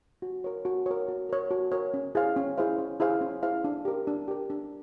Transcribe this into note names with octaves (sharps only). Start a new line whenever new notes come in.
F#4
A#4 C#5
F#4
A#4 C#5
F#4
A#4 C#5
F#4
A#4 C#5
C#4
E4 G#4 C5 F5
C#4
E4 G#4 C5 F5
C#4
E4 G#4 C5 F5
C#4
E4 G#4 C5 F5
D4
G4 A#4
D4
G4 A#4
D4